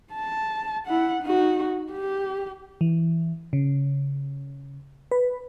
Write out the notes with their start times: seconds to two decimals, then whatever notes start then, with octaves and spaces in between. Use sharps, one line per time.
0.13 A5
0.86 E4 F#5
1.22 D#4 F#4
1.91 G4
2.81 E3
3.53 C#3
5.11 B4